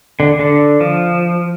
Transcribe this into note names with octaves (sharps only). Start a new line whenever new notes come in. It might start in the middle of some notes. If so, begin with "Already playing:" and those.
D3
D3
F3